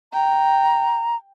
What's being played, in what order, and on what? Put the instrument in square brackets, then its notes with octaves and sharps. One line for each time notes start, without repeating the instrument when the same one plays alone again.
[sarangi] G5 [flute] A#5